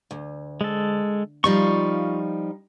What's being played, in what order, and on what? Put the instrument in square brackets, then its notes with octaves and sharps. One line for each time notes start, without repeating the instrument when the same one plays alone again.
[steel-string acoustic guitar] D2
[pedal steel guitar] G#3 A4
[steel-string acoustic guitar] F3 G3 D#4 [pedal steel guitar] F4 C#6